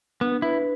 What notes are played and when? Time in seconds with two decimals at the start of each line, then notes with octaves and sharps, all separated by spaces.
0.21 B3 D4
0.42 E4 B4